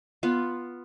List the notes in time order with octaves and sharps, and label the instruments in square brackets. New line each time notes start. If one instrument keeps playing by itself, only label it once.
[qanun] B3 F4 B4